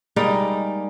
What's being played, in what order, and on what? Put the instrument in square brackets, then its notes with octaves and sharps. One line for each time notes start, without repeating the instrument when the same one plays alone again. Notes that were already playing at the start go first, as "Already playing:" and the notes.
[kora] G3 G#3 A#3 D#4